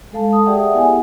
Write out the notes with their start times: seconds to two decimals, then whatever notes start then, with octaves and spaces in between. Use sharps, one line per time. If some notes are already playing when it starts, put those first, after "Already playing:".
0.12 G#3 A4 F5 A5
0.31 A4 D#6
0.46 G4 G#4 D5 E5 F#5 G5
0.74 B3 E4 F#5 G#5